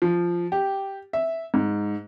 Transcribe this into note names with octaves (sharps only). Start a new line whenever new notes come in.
F3
G4
E5
G#2